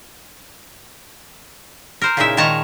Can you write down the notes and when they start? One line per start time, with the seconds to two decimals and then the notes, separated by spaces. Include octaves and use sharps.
2.02 A#4 C5
2.17 A#2 C#3 G#3 D#4 E4 E5
2.37 A#2 D#3 G#3 C#5 A5 A#5